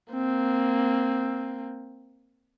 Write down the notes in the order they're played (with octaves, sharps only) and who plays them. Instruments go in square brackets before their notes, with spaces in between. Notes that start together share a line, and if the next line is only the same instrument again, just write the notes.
[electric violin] A#3 C4